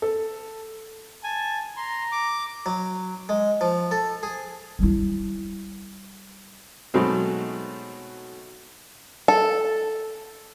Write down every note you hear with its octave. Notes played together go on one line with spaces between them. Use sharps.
A4
G#5 A5
A#5 C6
D6
F#3
G#3
F3
A4
G#4
G3 E4
B2 F#3 G#3 A3 C4 D#4
A4